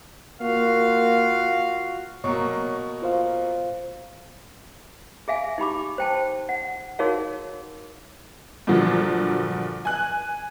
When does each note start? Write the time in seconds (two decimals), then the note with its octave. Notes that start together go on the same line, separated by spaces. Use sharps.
0.41 A#3 F4 F#4 F5
2.24 B2 F#3 A#3 C#5 C#6
3.02 F4 C5 F5
5.28 G#4 E5 F5 G#5
5.58 D#4 G4 B5 D6
5.98 C5 G5 A5
6.49 F#5
6.99 D#4 F#4 G#4 A#4 C#5 F5
8.67 G2 A#2 D3 F3 F#3
9.85 G#5 F#6